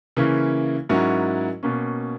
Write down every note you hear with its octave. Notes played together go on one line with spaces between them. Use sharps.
C#3 E3 A#3 C#4 E4
G#2 F#3 C#4 E4 A#4
B2 A#3 C#4